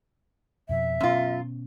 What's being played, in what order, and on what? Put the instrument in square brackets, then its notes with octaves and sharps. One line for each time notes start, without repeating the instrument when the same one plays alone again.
[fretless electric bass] F2 B2 F3 [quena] E5
[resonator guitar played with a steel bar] F#2 F4 [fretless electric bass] B2 B3 C#4